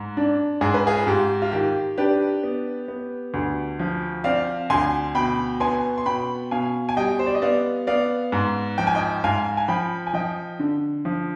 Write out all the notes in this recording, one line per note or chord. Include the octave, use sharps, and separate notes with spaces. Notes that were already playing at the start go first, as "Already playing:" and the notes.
Already playing: G#2
D4
G#2 G#4
B4
F4 G#4
G#2 G4
F4
D#3 G4
D4 G4 B4
B3
B3
D2
F3
C4 D5 F5
D2 G#5 C6
B2 G5 B5
B3 G#5 C6
C6
B2 G5 B5
B2 F5 G#5
G#5
G3 D#5 G5
C5
D5
D#5
B3 D5 F5
B3 D5 F5
G#2
F3 G5
G#5
D#5 G5
G#2 F5 G#5
G#5
F3 G5 B5
G#5
F3 D#5 G5
D3
F3